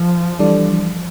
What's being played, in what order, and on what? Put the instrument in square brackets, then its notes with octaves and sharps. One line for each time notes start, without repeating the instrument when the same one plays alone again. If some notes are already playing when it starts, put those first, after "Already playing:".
Already playing: [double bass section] F3
[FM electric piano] E3 G3 D4 A4 D5